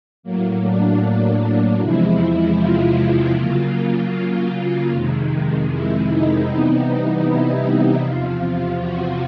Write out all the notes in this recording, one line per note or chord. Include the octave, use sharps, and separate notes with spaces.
A2 F#3 A#3
D4
D4
E2 C3 F3 G#3 E4
F4
C#3 F#3 A#3
F2 C3 D#3 G#3
E4
D#4
C3 E3 G3 B3 D#4
E4
E2 C3 F3 F4
F#4